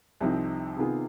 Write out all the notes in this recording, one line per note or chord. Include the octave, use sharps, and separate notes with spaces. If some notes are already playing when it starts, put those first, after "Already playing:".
C2 C3 F3 C4 D#4
C3 D#3 B3 F4 G#4